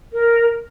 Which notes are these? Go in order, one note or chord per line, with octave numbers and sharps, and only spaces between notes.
A#4